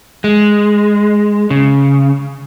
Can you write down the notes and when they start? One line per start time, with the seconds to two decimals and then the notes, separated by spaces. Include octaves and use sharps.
0.24 G#3
1.50 C#3